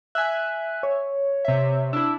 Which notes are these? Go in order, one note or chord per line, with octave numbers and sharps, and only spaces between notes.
E5 G#5 F#6
C#5
C3 E5
D4 E4 E6